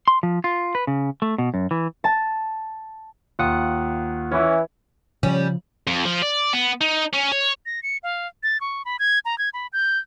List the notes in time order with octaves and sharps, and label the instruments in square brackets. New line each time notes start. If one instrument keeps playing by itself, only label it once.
[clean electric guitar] C6
F3
F4
B4
C#3
A3
B2
F#2
E3
[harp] A5
[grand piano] D#2 [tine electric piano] F4 F#5 D#6
[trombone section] E3 [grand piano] C#4
[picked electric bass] C#3 F3 [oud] G3 C#4
[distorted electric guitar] F2
F3
D5
B3
D#4
C#4
C#5
[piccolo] A#6
C#7
F5
A6
C#6
B5
G#6
A#5
G#6
B5
G6